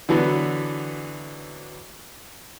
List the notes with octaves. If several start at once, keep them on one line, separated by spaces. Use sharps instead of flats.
D3 E3 F#3 B3